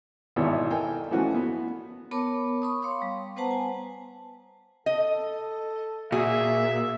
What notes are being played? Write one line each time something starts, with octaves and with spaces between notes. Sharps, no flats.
G#1 B2 E3 C#5 D5 E5
A4 A#4 G5 G#5
E3 F3 A3 C#4 F#4
B3
B3 A#4 C#5 A5 B5 D6
B5 C#6 D#6
C#5 F5 C6 D6
G3
B3 B4 C5 F#5 A5 A#5
G#5
A4 D#5
A#2 F#4 G#4 E5